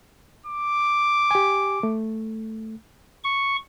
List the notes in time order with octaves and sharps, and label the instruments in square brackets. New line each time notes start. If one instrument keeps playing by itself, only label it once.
[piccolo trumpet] D6
[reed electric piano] G4 G#5
A3
[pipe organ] C#6